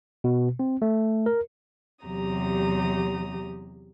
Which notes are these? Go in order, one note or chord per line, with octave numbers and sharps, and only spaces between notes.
B2
C4
A3
A#4
E2 C3 F#3 G4 A#5 D#6